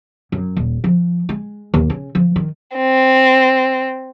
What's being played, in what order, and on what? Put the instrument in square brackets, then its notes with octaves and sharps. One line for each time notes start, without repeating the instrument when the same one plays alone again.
[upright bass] F#2
D#1
F3
G#3
D#2
C#3
F3
D#3
[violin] C4